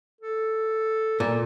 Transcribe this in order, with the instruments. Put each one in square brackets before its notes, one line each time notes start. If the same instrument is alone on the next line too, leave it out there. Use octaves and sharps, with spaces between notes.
[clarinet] A4
[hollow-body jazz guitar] A#2 [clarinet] A4